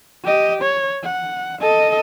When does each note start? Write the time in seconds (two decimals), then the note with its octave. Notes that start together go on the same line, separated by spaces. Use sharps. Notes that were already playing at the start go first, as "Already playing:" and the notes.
0.25 G4 D#5
0.62 C#5
1.04 F#5
1.61 A4 D#5